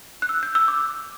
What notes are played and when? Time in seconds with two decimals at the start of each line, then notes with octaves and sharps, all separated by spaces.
0.22 F#6
0.29 E6
0.43 G6
0.55 E6
0.68 D6